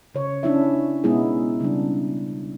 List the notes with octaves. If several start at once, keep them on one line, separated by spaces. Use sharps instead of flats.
C#3 C#5
C#4 D4 E4 E5
B2 G#3 B3 D#4 E4 G#4
C#3 G3 D4